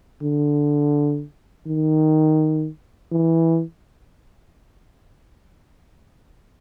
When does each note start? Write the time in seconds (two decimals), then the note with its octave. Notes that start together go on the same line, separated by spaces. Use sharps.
0.23 D3
1.67 D#3
3.12 E3